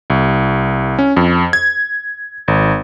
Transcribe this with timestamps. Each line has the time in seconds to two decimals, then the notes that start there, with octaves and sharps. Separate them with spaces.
0.10 C2
0.99 C#4
1.17 F2
1.53 G#6
2.48 G#1